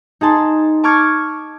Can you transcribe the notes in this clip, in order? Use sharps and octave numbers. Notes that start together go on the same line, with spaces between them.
D#4 G#4 A5 C6
A5 C#6 D6 F6 G#6 C#7